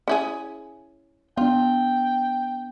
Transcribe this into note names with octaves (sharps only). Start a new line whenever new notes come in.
C#4 E4 G#4
B3 D4 F4 G5